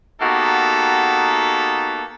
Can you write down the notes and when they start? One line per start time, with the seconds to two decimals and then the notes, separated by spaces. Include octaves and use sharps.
0.21 A#3 B3 D#4 F#4 G4 A4